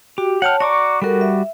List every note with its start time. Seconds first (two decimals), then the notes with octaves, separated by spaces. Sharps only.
0.18 F#4 G4
0.42 C#5 F#5 G5 A5 F6
0.60 F#4 D5 A#5 C#6 D6
1.02 G3 F#4 A4 A#4
1.21 E5